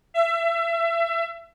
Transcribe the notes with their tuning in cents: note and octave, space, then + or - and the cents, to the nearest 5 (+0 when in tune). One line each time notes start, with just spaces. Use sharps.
E5 +30